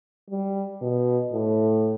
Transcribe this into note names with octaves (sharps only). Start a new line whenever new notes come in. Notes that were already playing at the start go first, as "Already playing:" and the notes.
G3
B2
A2